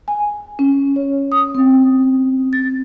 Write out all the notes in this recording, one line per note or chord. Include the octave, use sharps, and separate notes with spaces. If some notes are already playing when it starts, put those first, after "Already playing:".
G#5
C#4
C#5
D#6
C4
A6